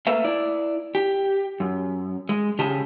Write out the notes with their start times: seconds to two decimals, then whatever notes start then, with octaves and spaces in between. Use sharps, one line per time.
0.07 A3 A#3 B4 E5 F5
0.24 E4 D5
0.95 G4
1.60 F#2
2.29 G#3
2.59 C#3 G4 G#4 A5